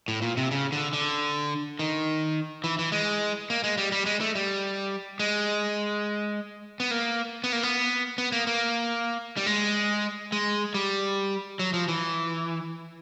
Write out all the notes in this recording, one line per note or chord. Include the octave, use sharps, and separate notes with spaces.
A2
A#2
C3
C#3
D3
D3
D#3
E3
E3
G#3
A#3
G#3
G3
G3
G#3
A3
G3
G#3
B3
A#3
B3
A#3
B3
B3
A#3
A#3
G3
G#3
G#3
G3
F#3
F3
E3